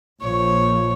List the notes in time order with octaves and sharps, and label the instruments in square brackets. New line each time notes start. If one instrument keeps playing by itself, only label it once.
[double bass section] A#1 A#2 F3 [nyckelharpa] C#5